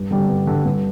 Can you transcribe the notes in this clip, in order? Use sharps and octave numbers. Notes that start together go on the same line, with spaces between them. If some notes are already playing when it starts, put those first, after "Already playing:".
Already playing: G2
D3 G3
G2
D3 G3
G2